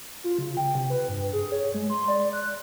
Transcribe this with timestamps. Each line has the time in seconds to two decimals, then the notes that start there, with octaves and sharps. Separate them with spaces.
0.24 F4
0.38 C#3
0.57 G5
0.75 C3
0.90 B4
1.09 G2
1.33 G#4
1.52 C#5
1.74 G#3
1.90 C6
2.08 D5
2.33 F#6